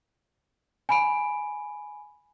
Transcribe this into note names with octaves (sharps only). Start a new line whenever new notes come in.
G#5 B5 D7